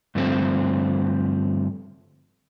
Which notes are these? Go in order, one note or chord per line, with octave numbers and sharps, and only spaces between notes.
G2 D3 F3 A3 C4